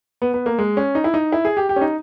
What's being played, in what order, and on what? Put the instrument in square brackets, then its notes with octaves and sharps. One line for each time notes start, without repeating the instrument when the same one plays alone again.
[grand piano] B3
B3
A#3
G#3
C#4
D#4
E4
D#4
E4
G#4
G4
G4
C#4
D#4